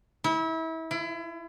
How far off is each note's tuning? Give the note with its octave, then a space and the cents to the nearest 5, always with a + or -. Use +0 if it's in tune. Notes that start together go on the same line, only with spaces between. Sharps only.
E4 -30
E4 +35